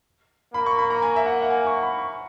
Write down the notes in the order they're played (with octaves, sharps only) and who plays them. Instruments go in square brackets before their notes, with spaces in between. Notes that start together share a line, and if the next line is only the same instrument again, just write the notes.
[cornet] A#3 [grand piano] B5
[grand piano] C#6
B5
A#5
G#5
E5
F#5
F#5
G#5
C#6
B5
C#6